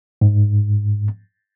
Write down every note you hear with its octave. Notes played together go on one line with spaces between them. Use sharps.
G#2